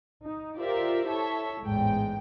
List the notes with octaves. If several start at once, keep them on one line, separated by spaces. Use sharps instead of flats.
D#4
F4 G4 A#4 C5 D5 E5
E4 A4 C#5 E5
A1 E2 G#2 G#3 G5